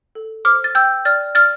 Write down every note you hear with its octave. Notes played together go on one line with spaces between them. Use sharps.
A4
C5 D6 F6
A6
G5 E6 G6
D5 F6 A6
D5 F6 A6